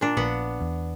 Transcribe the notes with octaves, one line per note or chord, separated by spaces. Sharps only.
A#2 D4
A#1 B3 F#5
E2